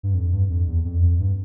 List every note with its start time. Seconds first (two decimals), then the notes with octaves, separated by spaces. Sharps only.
0.03 G2
0.15 F2
0.32 G2
0.50 F2
0.68 E2
0.85 F2
1.02 F2
1.20 G2